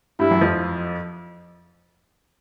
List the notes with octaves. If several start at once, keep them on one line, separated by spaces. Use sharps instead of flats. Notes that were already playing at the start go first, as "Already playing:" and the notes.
G2 G3 E4
F#2 F#3
F2 F3